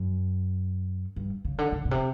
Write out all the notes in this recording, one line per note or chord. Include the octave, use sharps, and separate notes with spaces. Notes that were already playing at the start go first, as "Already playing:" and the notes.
Already playing: F#2
G2
C#3
D3
C#3
B2
C3